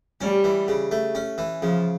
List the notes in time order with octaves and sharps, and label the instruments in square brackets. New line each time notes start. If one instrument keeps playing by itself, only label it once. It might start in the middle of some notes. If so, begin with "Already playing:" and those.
[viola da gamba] G3 [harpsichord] C#4
[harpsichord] E3
C#3
A3
C#4
E3
[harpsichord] C#3 [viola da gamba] F3